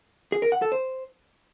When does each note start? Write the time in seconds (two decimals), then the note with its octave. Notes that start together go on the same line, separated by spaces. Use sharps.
0.32 G#4
0.42 A#4
0.52 F#5
0.62 A4
0.72 C5